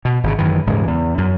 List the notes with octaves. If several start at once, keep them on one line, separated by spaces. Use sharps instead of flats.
B2
G#1 C#3
F#2 D#3 E3
D#1 G#2 C#3 E3
E2
F#2